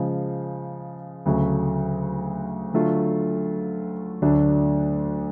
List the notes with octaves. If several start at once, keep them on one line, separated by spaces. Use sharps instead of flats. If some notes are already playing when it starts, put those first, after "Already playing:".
Already playing: C#3 F3 G#3
D2 C#3 F#3 A3
D3 F#3 A3 F4
D2 D3 F#3 A3 D4